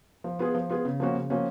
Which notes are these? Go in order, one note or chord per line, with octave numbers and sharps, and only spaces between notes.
F3
B3 F4 G#4
F3
B3 F4 G#4
C#3
F3 A#3 C#4 F#4
C#3
F3 A#3 C#4 F#4